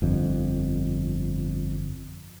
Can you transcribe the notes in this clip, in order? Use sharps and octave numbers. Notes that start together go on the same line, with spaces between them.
G1 F2